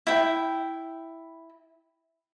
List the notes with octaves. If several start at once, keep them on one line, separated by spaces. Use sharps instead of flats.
E4 G5